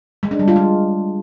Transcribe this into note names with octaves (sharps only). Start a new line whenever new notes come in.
G#3
D4
G3
F4
G#3